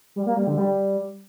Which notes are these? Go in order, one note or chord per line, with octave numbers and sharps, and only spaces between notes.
G3
A#3
G3
D3
G3